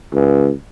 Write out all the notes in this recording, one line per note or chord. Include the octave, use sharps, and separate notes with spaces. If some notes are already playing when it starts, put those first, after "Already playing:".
C#2